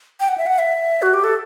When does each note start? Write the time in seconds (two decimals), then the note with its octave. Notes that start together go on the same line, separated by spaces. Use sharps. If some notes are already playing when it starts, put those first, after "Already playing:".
0.20 G5
0.28 F#5
0.38 E5
0.46 F#5
0.59 E5
1.02 F#4
1.13 G4
1.24 A4